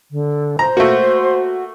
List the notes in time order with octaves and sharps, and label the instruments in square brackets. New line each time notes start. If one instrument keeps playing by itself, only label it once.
[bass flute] D3
[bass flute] C5 [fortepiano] A#5
[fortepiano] A3 A#3 [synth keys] F#4